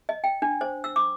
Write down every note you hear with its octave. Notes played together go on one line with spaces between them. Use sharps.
D#5
G5
D4
C5
E6
D6